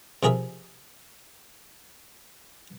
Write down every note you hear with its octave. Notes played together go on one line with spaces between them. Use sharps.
C3 F3 G#4 A#4 E5